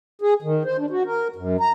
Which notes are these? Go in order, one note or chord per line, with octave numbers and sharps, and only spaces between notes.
G#4
D#3
C5
D4
F#4
A#4
F#2
A#5